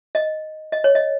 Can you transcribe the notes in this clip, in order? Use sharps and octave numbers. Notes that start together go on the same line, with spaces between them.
D#5
D#5
C#5
D#5